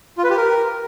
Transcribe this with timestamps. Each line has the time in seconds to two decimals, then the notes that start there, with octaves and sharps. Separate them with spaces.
0.18 F4
0.24 B4
0.30 G4
0.37 A#4